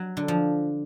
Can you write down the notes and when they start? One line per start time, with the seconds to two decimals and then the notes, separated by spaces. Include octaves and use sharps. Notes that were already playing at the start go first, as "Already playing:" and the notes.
Already playing: F#3
0.17 D3
0.28 F3